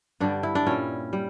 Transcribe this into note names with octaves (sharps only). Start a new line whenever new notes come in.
G2 D3 G3 D4
E4
D4
A#2 G3 C#4
G3